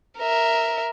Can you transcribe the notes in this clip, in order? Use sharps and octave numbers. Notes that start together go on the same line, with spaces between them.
A#4 E5